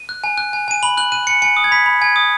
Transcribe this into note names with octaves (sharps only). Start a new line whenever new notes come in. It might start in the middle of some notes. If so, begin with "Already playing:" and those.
Already playing: D#7
F#6
G#5
F#6
G#5
G#5 D#7
B5 F#7
F#6 F#7
F#6 D#7
G#5 C#7
G#5 C#7
D#6
G#6
B5 B6
B5
G#5 G#6
D#6